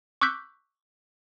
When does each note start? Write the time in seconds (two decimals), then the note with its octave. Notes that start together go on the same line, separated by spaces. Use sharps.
0.21 C#6 D6 E6 F#6 G6 B6